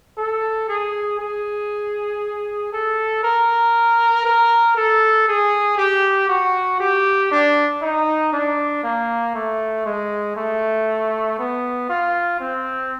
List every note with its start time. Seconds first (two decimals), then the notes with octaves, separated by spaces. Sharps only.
0.18 A4
0.69 G#4
1.19 G#4
2.73 A4
3.23 A#4
4.25 A#4
4.77 A4
5.28 G#4
5.78 G4
6.29 F#4
6.80 G4
7.31 D4
7.82 D#4
8.33 D4
8.83 A#3
9.35 A3
9.86 G#3
10.36 A3
11.38 B3
11.90 F4
12.40 C4